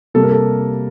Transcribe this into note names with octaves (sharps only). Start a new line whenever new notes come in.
C3 G3 A#3 A4
A#4
A4